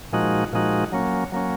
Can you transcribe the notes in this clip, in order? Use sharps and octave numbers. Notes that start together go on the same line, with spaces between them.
A#2 F3 G#3 D#4 F#4
A#2 F3 G#3 D#4 F#4
F#3 A#3 C#4
F#3 A#3 C#4